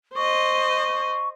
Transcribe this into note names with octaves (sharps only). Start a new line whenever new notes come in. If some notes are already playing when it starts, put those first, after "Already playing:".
C5 D#5 C#6